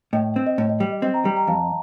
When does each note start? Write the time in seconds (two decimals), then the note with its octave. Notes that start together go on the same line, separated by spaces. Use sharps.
0.13 A2 D#5 G5
0.24 D#5
0.36 C4
0.47 D#5
0.58 A2 D#5
0.69 D#5
0.80 G3 D#5 G5
0.92 D#5
1.02 C4 D#5
1.14 G5 A#5
1.25 G3 G5 A#5
1.37 G5 A#5
1.47 F2 F5 A5